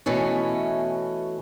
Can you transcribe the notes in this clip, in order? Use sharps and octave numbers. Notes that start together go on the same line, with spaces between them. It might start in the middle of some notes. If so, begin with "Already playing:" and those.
B2 E3 A3 C#4